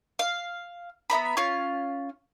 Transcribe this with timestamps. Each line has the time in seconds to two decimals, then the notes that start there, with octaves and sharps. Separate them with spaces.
0.19 F5
1.10 B3 E5 A#5 B5
1.37 C#4 F4 F5